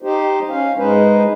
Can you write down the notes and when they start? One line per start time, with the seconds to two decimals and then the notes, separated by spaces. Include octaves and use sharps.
0.02 D#4 G4 C5
0.50 C#4 F5
0.78 G#2 G#3 D#4 B4 C5